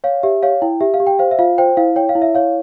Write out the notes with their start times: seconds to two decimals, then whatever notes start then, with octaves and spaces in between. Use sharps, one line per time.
0.04 C#5 F5
0.23 G4 E5
0.43 C#5 F5
0.62 E4 G5
0.81 G4 E5
0.94 F5
1.00 G4
1.07 G5
1.19 C5 F5
1.31 E5
1.39 F4 F5
1.58 C5 G5
1.77 E4 F5
1.96 C#5 G5
2.09 F5
2.15 E4
2.22 E5
2.35 C#5 F5